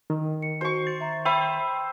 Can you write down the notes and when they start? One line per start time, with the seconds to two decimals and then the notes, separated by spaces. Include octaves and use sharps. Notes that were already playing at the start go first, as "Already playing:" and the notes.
0.10 D#3 A#4
0.42 C#7
0.61 F#4 C5 C#6
0.87 A6
1.00 E5 A#5
1.25 C5 E5 G5 B5 D#7